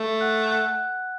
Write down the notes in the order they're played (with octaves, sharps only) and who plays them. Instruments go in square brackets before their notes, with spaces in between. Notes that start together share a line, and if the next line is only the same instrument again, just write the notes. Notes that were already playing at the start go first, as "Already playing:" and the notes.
Already playing: [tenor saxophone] A3
[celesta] F#5 F#6
F#5 F#6